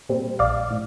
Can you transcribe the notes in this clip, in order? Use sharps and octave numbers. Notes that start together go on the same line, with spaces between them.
A#2 G3 C4
A#1 D5 F5
A2